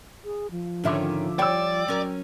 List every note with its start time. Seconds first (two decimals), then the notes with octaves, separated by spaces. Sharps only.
0.24 G#4
0.51 F3
0.84 G#2 D3 D#3 C#4 E5 D6
1.39 G3 C#5 D5 G5 E6
1.88 F#3 C#4 A#4